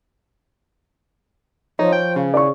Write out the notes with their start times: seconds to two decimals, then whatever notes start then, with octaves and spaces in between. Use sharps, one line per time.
1.79 F3 D#4 C#5
1.93 G5
2.16 C#3
2.34 E4 D5 C#6